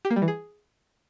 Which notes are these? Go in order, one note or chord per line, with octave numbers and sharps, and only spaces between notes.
G4
A#3
G3
E3
G#4